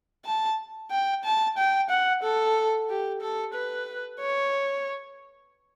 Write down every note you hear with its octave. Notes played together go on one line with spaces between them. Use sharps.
A5
G5
A5
G5
F#5
A4
G4
A4
B4
C#5